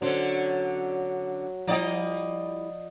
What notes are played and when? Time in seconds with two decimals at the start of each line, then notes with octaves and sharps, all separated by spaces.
0.02 D3 F#3 C#4 D4 C5
1.67 F3 G3 E4 D5 D#5 G5